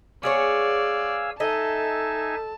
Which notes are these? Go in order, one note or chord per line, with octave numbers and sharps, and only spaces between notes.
B3 G#4 C#5 D5 F5 G#5 E6
D#4 A4 D#5 E5 G#5 A5